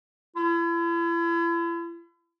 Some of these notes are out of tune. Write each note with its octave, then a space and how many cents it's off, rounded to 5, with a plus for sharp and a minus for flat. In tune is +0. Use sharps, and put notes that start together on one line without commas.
E4 +40